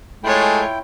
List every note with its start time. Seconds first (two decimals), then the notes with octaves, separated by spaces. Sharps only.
0.24 G#3 A3 E4 F4 C#5 G5